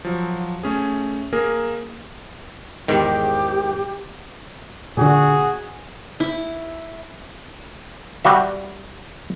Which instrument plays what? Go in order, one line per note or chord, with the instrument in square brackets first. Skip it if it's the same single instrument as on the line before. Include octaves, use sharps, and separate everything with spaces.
[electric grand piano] F3 F#3
A3 C#4 G#4
A#3 G#4 A#4
[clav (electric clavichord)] E2 G#2 D#3 [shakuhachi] G4
[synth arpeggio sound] A#2 D3 [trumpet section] F#4 G#4
[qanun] E4
[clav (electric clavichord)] G3 F#4 E5